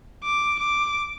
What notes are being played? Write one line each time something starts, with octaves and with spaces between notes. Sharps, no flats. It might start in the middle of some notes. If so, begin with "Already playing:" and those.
D6
D6